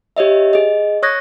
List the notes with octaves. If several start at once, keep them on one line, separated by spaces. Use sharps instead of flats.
G4 C#5 D#5 E5
G#4 D#5
C#5 C#6 D#6 F#6 G#6 A#6